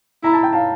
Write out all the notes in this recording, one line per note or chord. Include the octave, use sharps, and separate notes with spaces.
E4 A#5
A5
G5
F5 A5